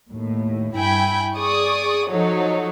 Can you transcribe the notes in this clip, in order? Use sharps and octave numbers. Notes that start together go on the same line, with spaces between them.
D#2 A2
G2 E4 G5 G#5 B5
G#4 D5 C#6 D#6
F3 F#3 D#4 A4 C#5